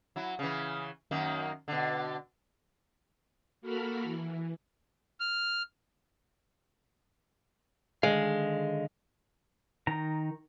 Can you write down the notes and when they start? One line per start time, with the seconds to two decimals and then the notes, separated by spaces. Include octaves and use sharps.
0.16 F#3 E4
0.39 C#3 E3
1.11 F#2 D#3 A#3
1.68 B2 D3
3.61 A#3 F#4 A4 A#4 B5 F6
4.03 E3
5.20 F6
8.03 D3 D#3 G#3 F5
9.87 D#3 A#5